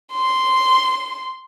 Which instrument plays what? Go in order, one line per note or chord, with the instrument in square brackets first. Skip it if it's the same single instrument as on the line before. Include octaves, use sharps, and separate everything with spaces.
[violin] C6